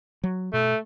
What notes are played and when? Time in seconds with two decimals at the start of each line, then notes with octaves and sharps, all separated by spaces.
0.24 F#3
0.53 B2 A3